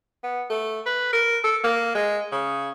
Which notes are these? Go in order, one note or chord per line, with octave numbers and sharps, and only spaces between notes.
B3
A3
B4
A#4
A4
A#3
G#3
C#3